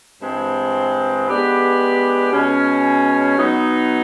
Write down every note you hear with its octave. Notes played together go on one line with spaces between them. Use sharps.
G2 E3 G#3 C4
G#3 B3 D4 G4 B4
B2 G#3 C#4
F#3 B3 D#4